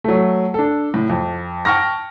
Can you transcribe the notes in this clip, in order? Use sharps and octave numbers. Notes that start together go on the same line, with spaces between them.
F#3 A3
D4 A4
A2
F2
G5 A5 C#6 F6 A#6